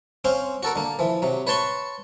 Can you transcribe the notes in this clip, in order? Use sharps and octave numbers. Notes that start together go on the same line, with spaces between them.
C4 C#4 C5 F5
F#4 A4 A#4
D3 A#3
E3 F3
C3 F#3
B4 C#5 A5 C6 C#6